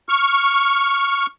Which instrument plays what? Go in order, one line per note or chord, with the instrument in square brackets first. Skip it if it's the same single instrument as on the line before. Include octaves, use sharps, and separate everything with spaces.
[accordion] C#6 F6